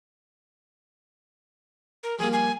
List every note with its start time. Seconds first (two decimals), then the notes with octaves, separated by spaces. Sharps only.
2.03 A#4
2.19 F3 G3 A#3 G#4
2.33 G#5